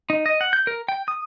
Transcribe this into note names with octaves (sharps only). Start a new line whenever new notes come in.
D#4
D#5
F#5
G6
A#4
G5
D#6